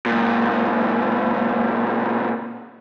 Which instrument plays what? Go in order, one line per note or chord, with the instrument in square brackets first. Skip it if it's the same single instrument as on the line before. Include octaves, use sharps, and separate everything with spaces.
[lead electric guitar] C#2 A#2